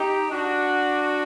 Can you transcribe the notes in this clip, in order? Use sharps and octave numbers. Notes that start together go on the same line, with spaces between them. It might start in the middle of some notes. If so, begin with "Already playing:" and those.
Already playing: D#4 G4
D4 F#4